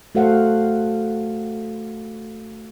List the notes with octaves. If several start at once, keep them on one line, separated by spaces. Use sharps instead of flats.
A3 F#4 A4 C5 F5 F#5